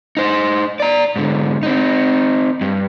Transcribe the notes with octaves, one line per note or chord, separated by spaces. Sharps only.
D#4 C5
D5 A#5
G#2 D3
C4 D#4
G2